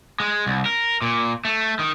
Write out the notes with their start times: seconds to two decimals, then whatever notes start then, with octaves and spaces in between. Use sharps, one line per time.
0.20 G#3
0.46 C2
0.66 A#4
1.02 A#2
1.45 A3
1.79 D#3